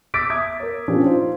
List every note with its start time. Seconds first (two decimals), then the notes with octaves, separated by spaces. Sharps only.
0.14 D6 E6 A6 B6 D7
0.30 E5 D#6 G#6
0.60 A#4 C#5
0.88 A#2 F3 C#4 D4 G4
1.06 D#4 F4 C5